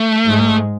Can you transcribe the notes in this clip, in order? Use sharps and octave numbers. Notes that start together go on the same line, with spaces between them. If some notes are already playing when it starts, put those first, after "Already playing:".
Already playing: A3
G#2 G#3